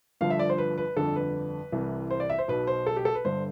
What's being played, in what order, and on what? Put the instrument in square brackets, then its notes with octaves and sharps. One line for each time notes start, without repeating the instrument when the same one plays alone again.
[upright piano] G1 G2 D3 F3 F5
E5
D5
C5
B4
B4
G1 F2 D3 A4
B4
C2 C3 E3
C5
D5
E5
C5
B1 B2 B4
C5
A4
G4
A4
B4
G1 G2 D3 C5